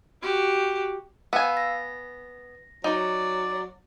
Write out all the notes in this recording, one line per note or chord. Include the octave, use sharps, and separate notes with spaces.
F#4 G4
B3 F5 G#5 E6
A#6
F#3 D#4 D5